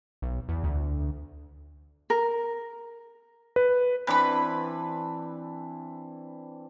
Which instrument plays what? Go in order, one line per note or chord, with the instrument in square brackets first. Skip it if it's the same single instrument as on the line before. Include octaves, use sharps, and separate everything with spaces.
[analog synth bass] B1
E2
D2
[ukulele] A#4
[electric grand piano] B4
[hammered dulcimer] E3 C4 D4 [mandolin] B4 B5